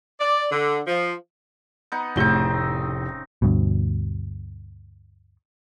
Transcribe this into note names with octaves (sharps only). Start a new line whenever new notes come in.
D5
D3
F3
B3 D#4
F1 A2 C#3 C4 D#4 G7
D2 G2 B2